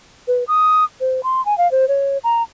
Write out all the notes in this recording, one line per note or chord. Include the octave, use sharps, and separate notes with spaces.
B4
D#6
C5
C6
G#5
F5
C5
C#5
A#5